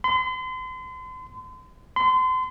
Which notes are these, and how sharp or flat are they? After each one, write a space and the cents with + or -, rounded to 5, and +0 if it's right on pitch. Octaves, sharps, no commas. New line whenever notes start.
C6 -40
C6 -35